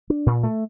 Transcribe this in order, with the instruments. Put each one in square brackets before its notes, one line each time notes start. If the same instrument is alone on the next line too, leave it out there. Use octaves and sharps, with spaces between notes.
[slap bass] D4
A#2
A3